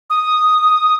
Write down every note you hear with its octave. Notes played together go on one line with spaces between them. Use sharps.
D#6